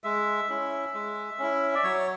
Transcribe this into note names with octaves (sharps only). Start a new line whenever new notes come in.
G#3 E5
C#4 E4
G#3
C#4 E4
D5
F#3 C#5